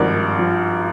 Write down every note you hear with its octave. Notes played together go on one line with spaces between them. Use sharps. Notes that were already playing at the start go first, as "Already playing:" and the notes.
Already playing: G#1 G2 F3 A#4 D5
F3